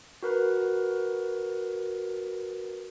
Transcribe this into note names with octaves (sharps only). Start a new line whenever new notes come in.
F#4 A#4 B4